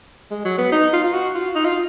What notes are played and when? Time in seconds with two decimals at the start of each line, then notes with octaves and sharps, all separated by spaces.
0.31 G#3
0.45 F#3
0.58 B3
0.72 D#4
0.93 F4
1.04 F4
1.14 F#4
1.35 F4
1.56 D#4
1.65 F4